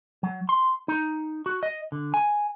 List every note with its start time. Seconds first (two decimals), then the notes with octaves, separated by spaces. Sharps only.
0.23 F#3
0.49 C6
0.88 D#4
1.46 F#4
1.63 D#5
1.92 D3
2.14 G#5